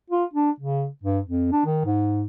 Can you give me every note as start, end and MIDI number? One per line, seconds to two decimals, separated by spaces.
0.10 0.25 65
0.33 0.50 62
0.60 0.87 49
1.03 1.20 43
1.26 1.50 41
1.52 1.60 62
1.66 1.81 51
1.85 2.26 44